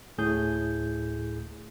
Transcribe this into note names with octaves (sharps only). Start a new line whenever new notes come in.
D2 A2 G#4 G6